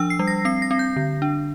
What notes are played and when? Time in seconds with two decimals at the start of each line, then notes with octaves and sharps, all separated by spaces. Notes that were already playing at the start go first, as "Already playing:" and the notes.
Already playing: F3 D4 E6
0.10 C7
0.19 G3
0.27 A#6
0.45 C4 C7
0.62 A#6
0.71 C4
0.79 G6
0.96 D3
1.22 D4